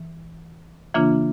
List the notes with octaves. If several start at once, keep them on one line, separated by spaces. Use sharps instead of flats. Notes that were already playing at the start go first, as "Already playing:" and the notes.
Already playing: E3
C#3 E3 A#3 D4 F4